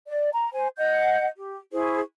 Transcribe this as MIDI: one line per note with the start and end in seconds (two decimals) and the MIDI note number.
0.07 0.29 74
0.33 0.52 82
0.53 0.68 72
0.53 0.68 80
0.77 1.26 75
0.77 1.26 78
0.77 1.26 91
1.37 1.58 67
1.72 2.00 64
1.72 2.00 68
1.72 2.00 72
1.72 2.00 85